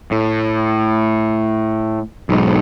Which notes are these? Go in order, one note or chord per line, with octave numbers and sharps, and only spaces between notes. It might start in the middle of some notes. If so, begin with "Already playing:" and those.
A2
B1 G#2